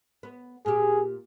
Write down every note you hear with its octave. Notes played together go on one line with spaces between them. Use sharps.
B3
A#2 G4 G#4